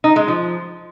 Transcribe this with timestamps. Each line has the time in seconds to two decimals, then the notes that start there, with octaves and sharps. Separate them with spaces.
0.04 D#4
0.16 G#3
0.28 F3